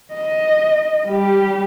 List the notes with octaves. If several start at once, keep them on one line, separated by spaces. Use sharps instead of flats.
D#5
G3 G4